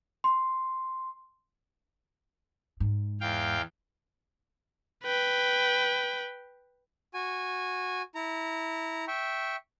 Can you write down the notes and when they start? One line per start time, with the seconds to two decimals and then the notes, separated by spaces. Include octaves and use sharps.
0.24 C6
2.80 G#2
3.21 E2 F5 G5
5.04 B4 G5
7.14 F#4 G#5
8.15 E4 A#5
9.08 E5 G5 C#6